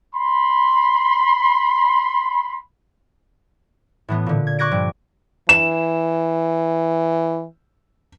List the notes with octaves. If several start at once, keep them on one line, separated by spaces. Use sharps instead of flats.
B5 C6
A2 E3 B3
A#2 D3
G#6
C#6 D6 F#6 G#6 A#6 D7
G2 F3
E3 E7